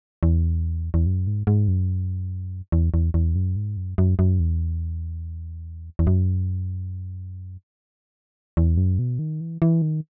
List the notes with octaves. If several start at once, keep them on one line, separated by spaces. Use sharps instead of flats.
E2
E2
F#2
G#2
G#2
F#2
E2
E2
E2
F#2
G#2
F#2
F#2
F#2
E2
E2
F#2
E2
F#2
B2
D#3
E3
E3
D#3